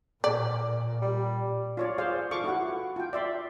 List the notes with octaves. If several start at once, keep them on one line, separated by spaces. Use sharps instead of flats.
A#2 D5
G3
F4 C#5 D5
G#4 C5 D5 F5
F4 A4 F5 C#6 D6
E4 F#4 F#5
F4 G5
D5 E5 C6